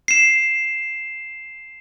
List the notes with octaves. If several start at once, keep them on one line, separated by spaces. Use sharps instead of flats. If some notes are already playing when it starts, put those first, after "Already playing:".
C7 E7